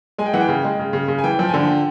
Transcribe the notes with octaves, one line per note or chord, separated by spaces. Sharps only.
G#3 G#5
G5
E3 F#5
G5
C#3
G#3
C#3
C#3
C#3
G#5
E3 G5
F3 G5
D3 G#5
G5